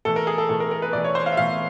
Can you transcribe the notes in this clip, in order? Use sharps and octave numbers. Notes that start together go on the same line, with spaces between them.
A2 E3 A4
A#4
G#4
A4
A2 E3 A4
A#4
A#4
B4
A2 E3 D5
C#5
C5
F5
E5
A2 E3 F5